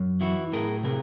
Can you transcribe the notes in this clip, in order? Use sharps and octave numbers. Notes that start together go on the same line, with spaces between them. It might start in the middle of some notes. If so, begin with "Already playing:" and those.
Already playing: F#2
E3 E4 F#4
A2 G#4 A#4
C3 G#4 A#4